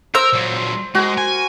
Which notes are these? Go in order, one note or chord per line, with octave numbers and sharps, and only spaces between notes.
A#4 C5 E6
A#2 F#3
G#3 F#4 A#4
G#5